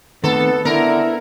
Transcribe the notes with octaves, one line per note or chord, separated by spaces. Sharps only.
D#3 A3 B3 C4 A4
D3 B3 E4 A#4